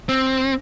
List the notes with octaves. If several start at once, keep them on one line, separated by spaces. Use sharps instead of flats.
C4